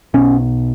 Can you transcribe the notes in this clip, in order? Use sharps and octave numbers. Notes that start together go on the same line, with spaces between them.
B1 B2 C#4